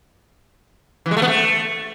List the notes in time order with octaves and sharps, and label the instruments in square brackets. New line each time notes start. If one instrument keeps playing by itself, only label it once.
[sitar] E3
G#3
A3
B3
A3